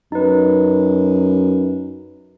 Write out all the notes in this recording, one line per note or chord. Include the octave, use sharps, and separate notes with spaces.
F#2 D#4 B4